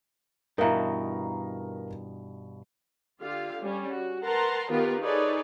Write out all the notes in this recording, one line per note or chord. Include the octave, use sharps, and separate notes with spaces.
G2 B2 E3 D#4 A#4 F5 A#5
D3 F4 G4 F5
G3 C#4
F#4
A#4 B4 F#5 A5 A#5 C6
D#3 B3 F4 G4 A#4 B4
D#4 G#4 A4 B4 C#5 D5